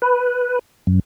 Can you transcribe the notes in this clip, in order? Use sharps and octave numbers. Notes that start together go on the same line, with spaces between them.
B4
F#2